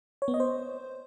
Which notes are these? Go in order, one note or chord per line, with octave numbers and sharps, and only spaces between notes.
C#5
B3
D#5
C5